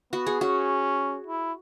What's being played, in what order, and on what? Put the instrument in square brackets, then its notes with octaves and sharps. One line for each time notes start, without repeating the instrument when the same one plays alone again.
[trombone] B3 [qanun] F#4
[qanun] G#4
[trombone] C#4 [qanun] F#4
[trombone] E4